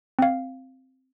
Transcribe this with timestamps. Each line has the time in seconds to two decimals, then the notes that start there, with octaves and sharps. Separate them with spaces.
0.19 C4 F5